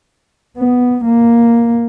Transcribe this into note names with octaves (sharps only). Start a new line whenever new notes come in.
B3
A#3